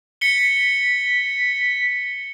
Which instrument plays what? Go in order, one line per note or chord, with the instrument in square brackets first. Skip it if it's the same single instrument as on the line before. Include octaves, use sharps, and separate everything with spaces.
[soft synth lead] B6 [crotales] C#7 G7